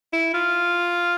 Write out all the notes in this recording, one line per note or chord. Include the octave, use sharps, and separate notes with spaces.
E4
F4